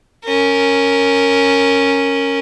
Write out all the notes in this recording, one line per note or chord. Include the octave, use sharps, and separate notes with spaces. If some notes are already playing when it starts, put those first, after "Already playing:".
C#4 A#4